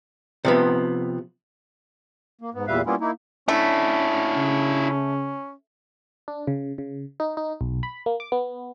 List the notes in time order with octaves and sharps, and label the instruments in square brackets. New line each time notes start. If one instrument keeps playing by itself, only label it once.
[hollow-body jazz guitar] C3 F3 B3
[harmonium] A#3
G#2 B3
E2 A#2 G3 B4 E5 F5
G3 A#3 B3 C#4 E4 F4
A#3 D#4 E4
[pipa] A3 [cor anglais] C#4 [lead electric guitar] D4 E4
[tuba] C#3
[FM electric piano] D4
C#3
C#3
D#4
D#4
B1
B5
A#3
D6
B3